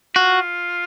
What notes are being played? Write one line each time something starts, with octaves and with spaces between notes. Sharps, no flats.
F4 F#4